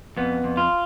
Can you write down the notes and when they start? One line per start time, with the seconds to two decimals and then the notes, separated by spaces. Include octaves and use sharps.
0.17 F2 B3
0.44 F2
0.57 F4